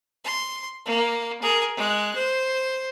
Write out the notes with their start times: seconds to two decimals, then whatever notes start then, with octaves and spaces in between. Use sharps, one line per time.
0.24 C6
0.86 A#3
1.42 G#4 A#4
1.76 G#3 F#6
2.16 C5